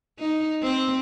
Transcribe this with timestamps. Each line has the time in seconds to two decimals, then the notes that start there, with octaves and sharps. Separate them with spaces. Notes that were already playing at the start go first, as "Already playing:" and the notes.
0.19 D#4
0.63 C4